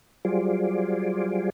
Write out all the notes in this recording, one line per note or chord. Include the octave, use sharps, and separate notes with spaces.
F#3 G3 F4 G#4 C5 D5